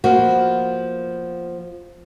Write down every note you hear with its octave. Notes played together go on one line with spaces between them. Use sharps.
F3 A#3 B3 F#4